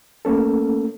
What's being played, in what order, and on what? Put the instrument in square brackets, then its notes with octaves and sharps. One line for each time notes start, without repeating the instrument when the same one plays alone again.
[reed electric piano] A3 A#3 C#4 A4